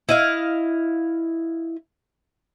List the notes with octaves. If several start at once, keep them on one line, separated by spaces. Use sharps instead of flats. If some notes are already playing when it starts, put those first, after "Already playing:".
E4 D#5 F5